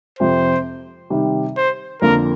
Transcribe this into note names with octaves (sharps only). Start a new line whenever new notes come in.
F2 C3 F3 C4 C5
C3 D#3 G3
C5
F2 D3 F3 A#3 F4 A#4